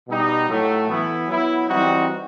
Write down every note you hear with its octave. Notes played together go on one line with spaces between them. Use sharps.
B2 G3 D#4 G4
A2 F#3 A3
E3 B3 E4
F#3 B3 E4
E3 G3 C4 D#4 F#4